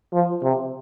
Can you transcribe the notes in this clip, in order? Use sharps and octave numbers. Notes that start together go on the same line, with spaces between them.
F3
C3